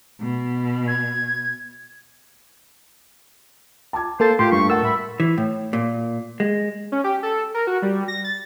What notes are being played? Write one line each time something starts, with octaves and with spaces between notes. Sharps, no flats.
B2
G#6
A5 D6 G#6
A#3 A4 C5 A6
A2 A3 F4 G4 C6
G2 C#6
A4 A#4 F#5 E6
E5 B5
E3
A2
A#2
G#3
C#4
G4
A4
A#4
F#4
G3
A#6
A6